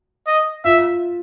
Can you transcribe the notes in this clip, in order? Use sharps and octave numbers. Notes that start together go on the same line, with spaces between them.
D#5
F4 E5